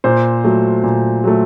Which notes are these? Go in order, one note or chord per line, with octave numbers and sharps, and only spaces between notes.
A#2 C5
F#3 A3
A#2
F#3 A3